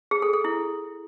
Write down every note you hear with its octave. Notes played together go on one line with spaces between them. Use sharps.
G#4
A4
A4
E4